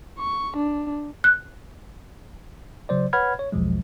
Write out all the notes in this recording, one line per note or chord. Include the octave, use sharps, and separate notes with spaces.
C#6
D4
F#6
C#3 F#3 C5 D5
B4 C#5 F#5 B5 F6 G#6
C#5
A#1 E2 B2 F3 F#3 G#3